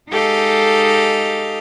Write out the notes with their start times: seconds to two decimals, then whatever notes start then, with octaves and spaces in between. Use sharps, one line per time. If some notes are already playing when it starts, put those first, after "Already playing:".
0.11 G#3 D#4 G4 A4 D#5 F5